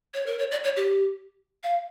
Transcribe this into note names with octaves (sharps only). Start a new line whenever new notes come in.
C#5
A#4
C#5
D5
C#5
G4
F5